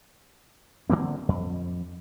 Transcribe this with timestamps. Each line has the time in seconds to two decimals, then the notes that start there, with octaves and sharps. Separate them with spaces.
0.89 D3 F3 A#3 C4
1.29 F2